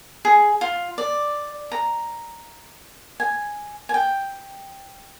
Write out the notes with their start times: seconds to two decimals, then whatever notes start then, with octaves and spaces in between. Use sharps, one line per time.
0.25 G#4
0.61 F4
0.98 D5
1.72 A#5
3.20 G#5
3.89 G#5
3.94 G5